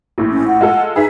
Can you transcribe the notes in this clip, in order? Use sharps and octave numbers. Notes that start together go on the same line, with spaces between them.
A#1 A2
C#4
F#5
G#3 F4 A4
D#4 G#4 B4 E5